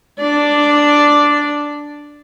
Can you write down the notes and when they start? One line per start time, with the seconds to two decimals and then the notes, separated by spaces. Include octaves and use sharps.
0.20 D4 D5